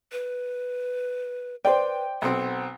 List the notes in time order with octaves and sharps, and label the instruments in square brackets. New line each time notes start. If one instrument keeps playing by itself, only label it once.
[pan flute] B4
[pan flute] B4 [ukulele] C5 D5 [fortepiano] G5
[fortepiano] B1 C4 [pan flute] F#5